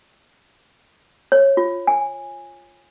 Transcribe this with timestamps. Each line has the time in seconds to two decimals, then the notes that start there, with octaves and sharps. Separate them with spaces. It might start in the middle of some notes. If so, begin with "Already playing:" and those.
1.32 C#5
1.57 F4
1.87 G#5